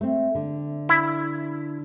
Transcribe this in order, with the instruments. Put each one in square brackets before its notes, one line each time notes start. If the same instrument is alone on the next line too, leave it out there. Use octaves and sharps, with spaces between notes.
[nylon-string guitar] A3 C4
D3
[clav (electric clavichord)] E4